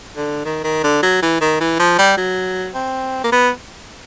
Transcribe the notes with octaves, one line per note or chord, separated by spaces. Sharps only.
D3
D#3
D#3
D3
F#3
E3
D#3
E3
F3
G3
F#3
C4
A#3
B3